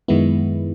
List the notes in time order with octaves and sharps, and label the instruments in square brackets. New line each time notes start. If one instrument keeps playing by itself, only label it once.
[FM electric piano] F#2 D#3 G#3 B3 E4